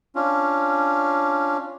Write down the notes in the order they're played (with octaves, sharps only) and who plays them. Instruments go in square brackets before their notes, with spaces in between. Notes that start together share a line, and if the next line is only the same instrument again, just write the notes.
[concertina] C#4 D4 F4